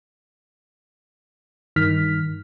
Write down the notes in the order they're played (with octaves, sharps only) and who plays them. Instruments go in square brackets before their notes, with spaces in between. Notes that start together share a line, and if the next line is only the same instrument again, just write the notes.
[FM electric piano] G2 D#3 F6 B6